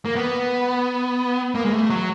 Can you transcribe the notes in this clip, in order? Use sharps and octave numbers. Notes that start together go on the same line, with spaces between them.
A#3
B3
A#3
G#3
A3
F#3